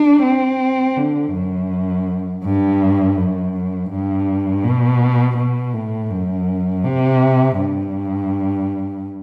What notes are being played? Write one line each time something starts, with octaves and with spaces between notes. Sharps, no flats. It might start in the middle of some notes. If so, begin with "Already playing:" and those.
Already playing: D4
C4
D3
F#2
G2
F#2
G2
B2
B2
A2
F#2
C3
G2